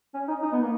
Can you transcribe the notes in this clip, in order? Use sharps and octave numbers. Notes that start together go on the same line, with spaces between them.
C#4
D#4
D#4
B3
A#3